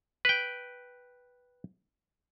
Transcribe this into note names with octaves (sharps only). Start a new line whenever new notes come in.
B4 G5